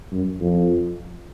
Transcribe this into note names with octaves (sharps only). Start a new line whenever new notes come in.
F#2
F2